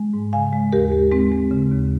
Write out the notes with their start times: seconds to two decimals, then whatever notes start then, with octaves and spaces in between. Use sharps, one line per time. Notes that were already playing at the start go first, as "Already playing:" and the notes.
Already playing: G#3
0.13 G#2
0.33 C#3 F5 G#5
0.53 G#3
0.72 D#2 G4 A#4
0.92 G#3
1.12 G#3 C4
1.32 G#3
1.51 C#3
1.71 D#2